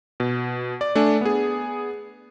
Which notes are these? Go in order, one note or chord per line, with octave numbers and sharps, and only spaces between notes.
B2
D5
A3 D4 D5 G#5
B3 G#4